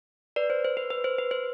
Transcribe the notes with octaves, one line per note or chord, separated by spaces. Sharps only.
B4 D5
C5
C5
B4
B4
C5
B4
C5